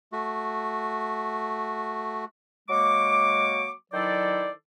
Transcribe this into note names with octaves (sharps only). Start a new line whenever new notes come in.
A3 F#4
F#3 G#3 A#3 C#6 D6
D#3 F#3 E4 A4 C5 D5